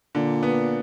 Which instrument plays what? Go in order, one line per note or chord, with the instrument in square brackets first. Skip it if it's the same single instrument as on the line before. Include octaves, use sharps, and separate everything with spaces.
[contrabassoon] A#2 [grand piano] D3
[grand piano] B3